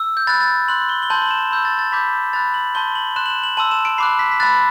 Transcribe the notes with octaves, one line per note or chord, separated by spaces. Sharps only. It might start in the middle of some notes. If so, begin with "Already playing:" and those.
Already playing: E6
G6
B5 F#6 A6
A6
C6 F#6 F#7
G7
G7
A5 C6 G6 F#7
F#7
E7
B5 E6 G6
A6
A6
B5 D6 G6 B6
G6
B5 F#6 A6
F#7
A5 C6 G6 G7
F#7
C6 F#6 E7
F#7
E7
F#7
A5 C6 E6 F#7
E7
D7
B5 D6 F#6 C7
B6
B6
B5 F#6 A6